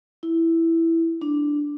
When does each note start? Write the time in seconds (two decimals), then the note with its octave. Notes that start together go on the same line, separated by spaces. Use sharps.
0.23 E4
1.22 D4